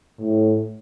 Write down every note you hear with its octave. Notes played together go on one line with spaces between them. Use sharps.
A2